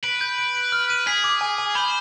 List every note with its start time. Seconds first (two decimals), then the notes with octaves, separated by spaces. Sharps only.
0.04 B4 D7
0.21 G6
0.38 D7
0.55 D7
0.72 F6
0.90 D#7
1.06 G#4 B6
1.24 D6
1.41 G#5
1.58 G#5
1.75 C5 B5